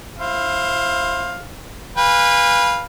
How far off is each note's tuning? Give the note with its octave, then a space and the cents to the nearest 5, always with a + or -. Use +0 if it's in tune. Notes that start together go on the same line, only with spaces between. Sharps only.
E4 +30 C5 +20 F5 +10
B4 -10 F5 +0 G#5 -40